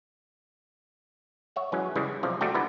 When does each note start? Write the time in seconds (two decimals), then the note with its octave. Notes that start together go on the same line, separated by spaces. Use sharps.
1.56 C#5 E5 F#5
1.72 E3 F#3 G#3 C#4
1.96 C#3 E3 G3 G#3
2.23 B1 C3 F3 D5
2.41 G3 A3 F#4 G5
2.54 D3 B3 E4 A#5